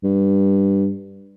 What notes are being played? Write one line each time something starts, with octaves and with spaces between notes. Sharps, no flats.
G2